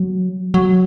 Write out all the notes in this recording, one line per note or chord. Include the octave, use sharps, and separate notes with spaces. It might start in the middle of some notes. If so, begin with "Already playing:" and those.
Already playing: F#3
F#3